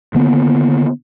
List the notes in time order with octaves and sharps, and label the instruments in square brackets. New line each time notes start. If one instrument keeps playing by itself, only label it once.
[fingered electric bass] D3 D#3 A#3 B3